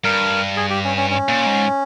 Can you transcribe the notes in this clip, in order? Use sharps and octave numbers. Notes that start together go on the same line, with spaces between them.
G2 A#4
G#4
G4
C#4
C#4
C#4
A#2
G#2